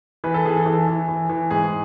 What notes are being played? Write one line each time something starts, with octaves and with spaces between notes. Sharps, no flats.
E3 B4
A4
E3 G#4
A4
E3
E3
E3
E3
G#2 G#4